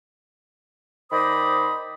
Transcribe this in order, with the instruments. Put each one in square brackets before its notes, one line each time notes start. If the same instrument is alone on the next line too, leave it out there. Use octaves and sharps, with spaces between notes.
[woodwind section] D#3 C5 D5 B5 D#6